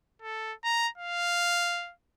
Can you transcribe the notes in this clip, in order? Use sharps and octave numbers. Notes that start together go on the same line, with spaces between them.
A4
A#5
F5